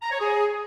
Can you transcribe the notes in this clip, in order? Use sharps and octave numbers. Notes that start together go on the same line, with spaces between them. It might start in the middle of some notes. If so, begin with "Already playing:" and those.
A#5
C#5
G#4